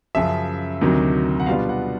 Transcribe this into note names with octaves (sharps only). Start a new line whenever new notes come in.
F#2 C#3 F3 E5
D2 C3 D#3 F#3
F#5
B2 G3 B3 D4 F4 F5
F#5